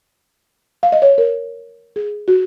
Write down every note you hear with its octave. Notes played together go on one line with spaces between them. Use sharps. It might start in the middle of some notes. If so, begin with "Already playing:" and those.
F5
D#5
C#5
A#4
G#4
F#4